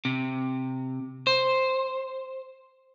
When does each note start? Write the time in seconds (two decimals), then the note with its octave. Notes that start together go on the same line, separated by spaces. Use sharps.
0.05 C3
1.27 C5